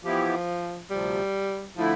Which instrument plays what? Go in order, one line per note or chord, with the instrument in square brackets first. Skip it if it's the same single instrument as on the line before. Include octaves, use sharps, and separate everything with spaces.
[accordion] E3 B3 E4 G4 [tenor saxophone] F3
[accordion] D2 C3 F3 [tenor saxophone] G3
[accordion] D3 A3 E4 [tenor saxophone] F3